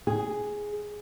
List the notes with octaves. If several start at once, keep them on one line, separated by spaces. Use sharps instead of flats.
G#4